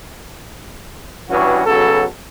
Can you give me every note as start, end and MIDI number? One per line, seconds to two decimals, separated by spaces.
1.29 1.62 43
1.29 1.62 52
1.29 1.62 61
1.29 1.62 66
1.66 2.04 35
1.66 2.04 49
1.66 2.04 54
1.66 2.04 69